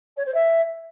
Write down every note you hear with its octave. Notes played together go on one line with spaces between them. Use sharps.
C#5
C5
E5